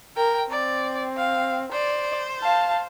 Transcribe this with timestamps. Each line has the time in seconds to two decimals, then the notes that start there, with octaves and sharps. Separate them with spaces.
0.17 A#4 G5
0.50 C4 D5
1.17 F5
1.72 C5 D5
2.40 F5 A5